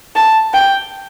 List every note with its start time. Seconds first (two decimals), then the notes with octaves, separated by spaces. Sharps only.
0.16 A5
0.54 G5